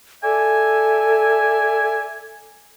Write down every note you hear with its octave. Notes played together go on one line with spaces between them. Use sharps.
A4 D5 E5 G#5